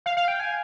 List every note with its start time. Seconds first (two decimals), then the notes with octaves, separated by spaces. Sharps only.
0.06 F5
0.17 F5
0.28 G5
0.40 G#5